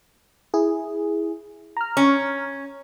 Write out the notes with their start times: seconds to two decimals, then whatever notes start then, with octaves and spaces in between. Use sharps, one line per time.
0.54 E4 G#4
1.77 A#5 F6
1.97 C#4